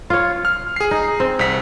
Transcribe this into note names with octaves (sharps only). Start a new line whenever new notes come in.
F4 C#5
F6
G#4 C7
D#4
C4
C2 F#5 B6